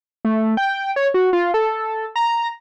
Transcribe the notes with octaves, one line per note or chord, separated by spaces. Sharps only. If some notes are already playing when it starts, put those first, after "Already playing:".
A3
G5
C#5
F#4
F4
A4
A#5